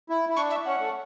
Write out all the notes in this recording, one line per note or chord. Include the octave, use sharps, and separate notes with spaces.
E4
E4
D4 C#6
E5
C#4 F#5
A3